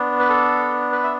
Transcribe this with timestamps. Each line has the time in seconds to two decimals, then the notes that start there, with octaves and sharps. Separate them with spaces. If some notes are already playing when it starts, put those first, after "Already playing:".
Already playing: B3 D4
0.20 B4
0.29 A4
0.92 B4
1.03 E5